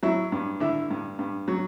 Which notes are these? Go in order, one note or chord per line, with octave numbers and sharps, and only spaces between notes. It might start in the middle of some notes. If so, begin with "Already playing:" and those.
F#3 E4
G2
D3 E4
G2
G2
F#3